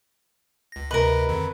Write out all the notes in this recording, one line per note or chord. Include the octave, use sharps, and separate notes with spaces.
C#2 A#6
D2 C3 A#4 B4 D#5
F2 D3 D#3